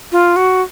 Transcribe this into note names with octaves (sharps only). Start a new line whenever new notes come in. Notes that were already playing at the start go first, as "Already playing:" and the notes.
F4
F#4